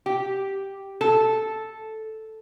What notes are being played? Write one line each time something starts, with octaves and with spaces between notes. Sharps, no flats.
G4
A4